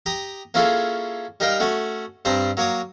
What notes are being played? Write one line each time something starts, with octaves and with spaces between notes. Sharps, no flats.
G4 A#5 D#6
A#3 C#4 E4 F4 G#4 A4
G3 D#4 A#4 F5 G5
A3 C#4 F#4 F#5
G2 G3 C4 D4 A#5 C6
F#3 A#3 C#5 D6 D#6